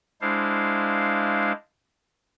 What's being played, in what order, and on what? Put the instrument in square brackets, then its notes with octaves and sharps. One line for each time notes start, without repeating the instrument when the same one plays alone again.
[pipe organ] G#3 D4 E4 C5 F5